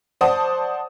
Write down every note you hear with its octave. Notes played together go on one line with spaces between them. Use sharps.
C5 D5 F#5 A5 D#6